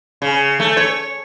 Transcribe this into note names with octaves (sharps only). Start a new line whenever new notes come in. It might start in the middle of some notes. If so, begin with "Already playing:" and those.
C#3
A3
C#5